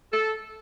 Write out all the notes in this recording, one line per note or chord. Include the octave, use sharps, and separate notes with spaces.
A4